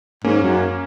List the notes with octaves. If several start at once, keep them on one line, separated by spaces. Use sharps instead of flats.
G#2 A#3 C#4
F#2